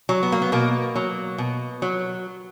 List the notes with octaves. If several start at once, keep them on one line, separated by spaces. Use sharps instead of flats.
F#3
B3
A#3
B3
B2 A#3
F#3
B2
F#3